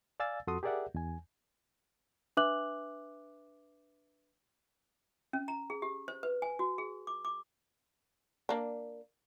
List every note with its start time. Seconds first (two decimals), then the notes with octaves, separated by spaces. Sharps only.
0.20 D5 F5 G#5 E6 A6
0.47 F2 F#4 A4 C6 D#6
0.63 G4 G#4 A#4 D5 E5 F#5
0.95 E2 G#5
2.37 D4 B4 E5 D6 F#6 F#7
5.33 C#4
5.48 A#5
5.70 G#4
5.82 G4
6.08 C5
6.23 B4
6.42 G#5
6.59 F#4
6.78 G#4
7.07 D6
7.25 D6
8.49 A#3 D4